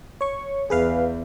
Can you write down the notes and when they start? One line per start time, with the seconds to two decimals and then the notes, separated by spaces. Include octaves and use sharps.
0.21 C#5 C#6
0.70 E2 G#4 B4 F5